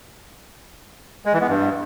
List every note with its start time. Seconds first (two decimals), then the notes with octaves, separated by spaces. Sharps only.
1.25 G#3
1.33 E3
1.41 B3
1.49 G2